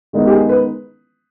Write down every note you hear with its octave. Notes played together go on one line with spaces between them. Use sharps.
D#3 G#3 B3 D#4
G4
G#4
B4